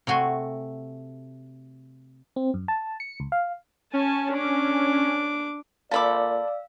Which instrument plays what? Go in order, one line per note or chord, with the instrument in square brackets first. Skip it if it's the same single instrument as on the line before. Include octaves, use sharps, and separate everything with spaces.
[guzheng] C3 A3 F#4 G#5 C6
[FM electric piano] C4
F#2
A5
C#7
C#2
F5
[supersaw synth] C#4 [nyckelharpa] G#5 A5
[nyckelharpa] D4 D6
[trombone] A#2 [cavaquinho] A4 B5 D6 [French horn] D5 [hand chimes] F5 E6